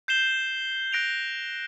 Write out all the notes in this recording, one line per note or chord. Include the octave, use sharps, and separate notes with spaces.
G6 C7 E7 G7
F#6 A#6 D7 F7